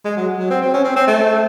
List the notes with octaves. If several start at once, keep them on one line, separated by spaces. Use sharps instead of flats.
G#3
F#3
F#3
C4
C4
C#4
C4
C4
A3